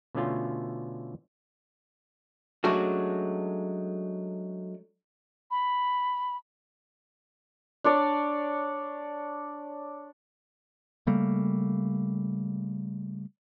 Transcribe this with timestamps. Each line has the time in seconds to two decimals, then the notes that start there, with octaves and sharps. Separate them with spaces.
0.15 B2 D3 A3 C#4 F4
2.64 F#3 G#3 A3 C#4 D4 F#4
5.51 B5
7.84 D4 C#5 D5
11.07 C#3 G3 A3 A#3